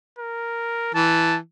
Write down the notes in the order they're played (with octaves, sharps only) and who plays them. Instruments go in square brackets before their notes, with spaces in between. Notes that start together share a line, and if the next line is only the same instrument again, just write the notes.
[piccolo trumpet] A#4
[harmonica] E3 [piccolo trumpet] A5